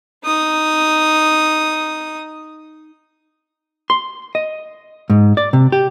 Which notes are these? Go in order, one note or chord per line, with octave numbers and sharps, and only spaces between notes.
D#4 D#6
C6
D#5
G#2
D5
C3
G4